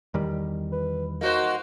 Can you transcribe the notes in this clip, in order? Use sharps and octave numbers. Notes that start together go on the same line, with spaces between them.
E2 D#3 G3
B4
A#3 D#4 F#4 C5